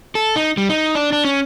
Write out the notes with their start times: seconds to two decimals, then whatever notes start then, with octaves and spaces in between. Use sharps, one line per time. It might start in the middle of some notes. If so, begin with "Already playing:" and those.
0.15 A4
0.36 D#4
0.57 G3
0.69 D#4
0.95 D4
1.13 D4
1.25 C#4